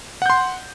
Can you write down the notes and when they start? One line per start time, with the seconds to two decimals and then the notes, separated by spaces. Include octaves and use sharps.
0.22 F#5
0.26 G6
0.30 C6